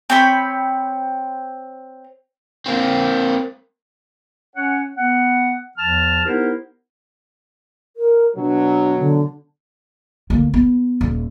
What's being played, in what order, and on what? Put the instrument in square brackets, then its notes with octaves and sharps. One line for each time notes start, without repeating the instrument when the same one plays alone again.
[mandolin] C4 C#5 G5 B5
[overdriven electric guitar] A#3 C4
[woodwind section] C#4 C#5 F#5
B3 F#5
E2 F3 A5 F6
B3 D#4 E4 G4 A#4 C5
[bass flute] A#4
[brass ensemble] B2 F#3 [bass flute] D4
[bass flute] D3
[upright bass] D2 A#3
B3
D#1